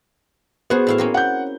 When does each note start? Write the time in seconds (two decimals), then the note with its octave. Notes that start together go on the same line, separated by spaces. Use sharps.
0.70 B3 F#4 G#4 C5
0.87 A2 E4 F5
0.98 A#3 C4 C#4
1.14 F#5 G6